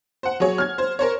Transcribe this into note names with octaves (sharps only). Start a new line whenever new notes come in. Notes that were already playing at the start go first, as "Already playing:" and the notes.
C5 F#5
F#3 G#4 C#5
F6 G#6
C5
A#4 C5 C#5